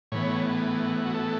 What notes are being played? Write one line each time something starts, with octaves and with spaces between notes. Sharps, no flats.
A2 E3 B3 C#5
F#4
A4